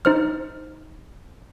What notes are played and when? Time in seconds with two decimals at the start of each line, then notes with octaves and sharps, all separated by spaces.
0.05 D#4 C5 F6